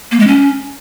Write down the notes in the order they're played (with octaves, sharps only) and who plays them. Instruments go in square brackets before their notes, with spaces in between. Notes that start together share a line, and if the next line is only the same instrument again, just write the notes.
[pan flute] A#3
G#3
C#4